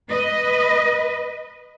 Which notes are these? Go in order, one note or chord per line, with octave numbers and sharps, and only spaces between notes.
B4 D#5